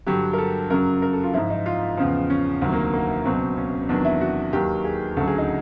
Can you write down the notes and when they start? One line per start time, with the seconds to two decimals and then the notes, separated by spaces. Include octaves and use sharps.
0.07 G2 D3 F#3 G4
0.33 A#4
0.38 A4
0.70 F#2 C#3 F#3 A#4
1.02 A#4
1.13 A4
1.23 F4
1.34 G#2 F3 E4
1.50 D#4
1.66 F4
1.97 E2 C#3 F3
2.30 C#4
2.61 D2 C3 D#3 F#3 C4
2.72 A#3
2.93 A#3
3.25 C#2 B2 F#3 C4
3.57 C#4
3.89 E2 C3 D#3 F#3 D4
4.05 E4
4.21 F#4
4.53 D#2 D#3 F#3 G4
4.85 G#4
5.17 D2 C#3 F#3 A4
5.27 G#4
5.38 D#4